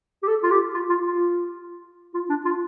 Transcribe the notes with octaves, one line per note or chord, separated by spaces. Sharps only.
G4
A4
F4
G4
F4
F4
F4
F4
D4
F4